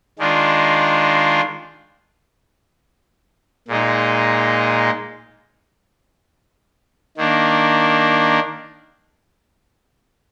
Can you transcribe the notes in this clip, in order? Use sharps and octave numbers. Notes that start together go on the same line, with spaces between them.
D#3 G#3 D4 F4
A#2 G#3 D#4
D#3 A#3 D4